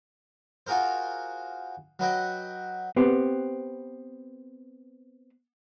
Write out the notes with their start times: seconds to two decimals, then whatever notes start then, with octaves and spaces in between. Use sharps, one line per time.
0.67 F4 F#4 G#4 A#4 C5
1.99 F#3 B4 D#5 G5
2.96 B3 C4 G4 B4